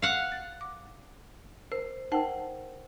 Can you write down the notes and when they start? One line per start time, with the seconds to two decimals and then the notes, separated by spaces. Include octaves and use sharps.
0.02 F5 F#5
0.32 A6
0.61 D6
1.72 A#4 C5
2.12 D#4 A#4 C5 F#5 G5